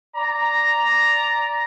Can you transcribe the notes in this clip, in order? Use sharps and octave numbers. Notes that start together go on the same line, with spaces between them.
D5 A#5